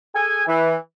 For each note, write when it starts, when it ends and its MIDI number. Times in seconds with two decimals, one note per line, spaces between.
0.15 0.42 68
0.15 0.42 69
0.15 0.42 80
0.47 0.75 52